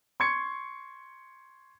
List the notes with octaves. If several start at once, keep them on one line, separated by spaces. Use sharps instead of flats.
C6 C#6 G#6 C#7